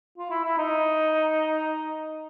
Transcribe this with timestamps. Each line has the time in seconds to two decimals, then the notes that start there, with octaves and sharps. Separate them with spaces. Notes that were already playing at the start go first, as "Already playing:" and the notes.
0.18 F4
0.30 E4
0.45 E4
0.58 D#4